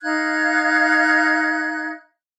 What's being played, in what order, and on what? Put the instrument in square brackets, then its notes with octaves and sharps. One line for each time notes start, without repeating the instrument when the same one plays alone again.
[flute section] D#4 F5 F#6 G#6